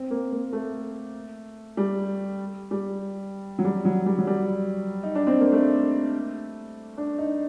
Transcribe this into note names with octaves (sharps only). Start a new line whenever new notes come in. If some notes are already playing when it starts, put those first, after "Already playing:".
Already playing: C4
A#3
A#3
A3
G3
G3
F#3
G3
F#3
G3
F#3
G3
D#4
D4
C4
A#3
A3
D4
D#4